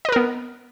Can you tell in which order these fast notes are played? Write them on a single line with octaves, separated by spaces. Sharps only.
D#5 B4 A#4 B3